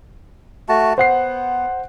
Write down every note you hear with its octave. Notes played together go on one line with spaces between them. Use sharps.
A3 F#4 A5
B3 C5 F#5 C7